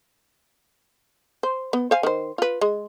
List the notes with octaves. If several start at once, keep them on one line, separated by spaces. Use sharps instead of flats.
C5
B3
C5 F5 G#5
D#3 C5
F4 B4
G#3